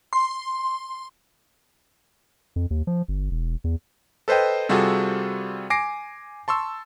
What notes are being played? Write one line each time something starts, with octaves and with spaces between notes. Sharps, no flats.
C6
F2
D#2
F3
G1
E1
E2
A4 B4 C5 D#5 G5
C3 G3 F4 F#4 G#4 A4
G#5 D6 A#6 C7 D7
A5 C6 C#6 E6